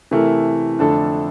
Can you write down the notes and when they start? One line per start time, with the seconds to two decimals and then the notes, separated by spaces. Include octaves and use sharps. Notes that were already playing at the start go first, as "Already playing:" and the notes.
0.11 C3 E3 A3 E4 A#4
0.79 F2 D3 A3 D4 A4